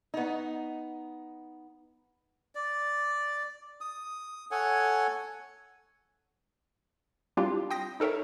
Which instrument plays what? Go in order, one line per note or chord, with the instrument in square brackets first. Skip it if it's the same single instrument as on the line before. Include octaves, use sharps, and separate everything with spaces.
[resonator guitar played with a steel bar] B3 D#4
[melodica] D5
D#6
A4 C#5 F#5 G#5
[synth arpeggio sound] G3 C4 D4 E4 F4 G4
G5 C6 D#6 A#6
D#4 A4 A#4 C#5 E5